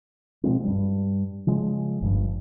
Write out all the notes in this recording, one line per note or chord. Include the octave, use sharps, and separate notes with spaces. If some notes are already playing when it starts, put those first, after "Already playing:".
B2 F3 G#3 C4
G2 G3
C#3 F3 G#3
G1 G2 F3